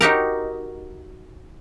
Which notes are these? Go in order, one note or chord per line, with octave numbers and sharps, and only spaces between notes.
D#4 F#4 G4 A#4